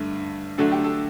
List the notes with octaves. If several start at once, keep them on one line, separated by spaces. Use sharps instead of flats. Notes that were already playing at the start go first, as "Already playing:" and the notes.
Already playing: G2 D3 A3
D3 F#3 A3 D4 A4
G4
A4